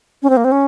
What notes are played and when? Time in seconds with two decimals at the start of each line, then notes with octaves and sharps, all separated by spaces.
0.23 C#4
0.30 C4
0.37 A#3
0.44 C4
0.52 C#4